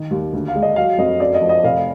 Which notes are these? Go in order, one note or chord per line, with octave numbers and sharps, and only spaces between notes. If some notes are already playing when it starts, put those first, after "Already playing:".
Already playing: D#3 D#5
D#2
D2
F5
G#3
D#5
F#3 F5
F2 D#5
F#2 D5
D#5
F3
D#5
F1 F5